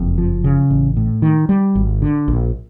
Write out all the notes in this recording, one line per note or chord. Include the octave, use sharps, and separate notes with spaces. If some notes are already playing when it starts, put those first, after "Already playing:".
Already playing: F#1 F2
F3
C#3
A1
A2
D#3
G3
G#1
D3
A#1